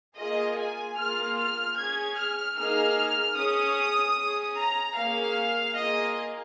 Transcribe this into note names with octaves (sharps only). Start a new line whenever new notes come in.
A#3 F4 G#4 D#5
G#5
A#3 F4 G#4 F6
F6
C#4 G#4 G#6
F6
A#3 D#4 G#4 F6
C#4 G#4 D#6
C#4 G#4
A#5
A#3 C#4 G#4 F5
A#3 F4 G#4 D#5